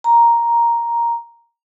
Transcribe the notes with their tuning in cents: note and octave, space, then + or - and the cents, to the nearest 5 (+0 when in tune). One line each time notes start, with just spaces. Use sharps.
A#5 +5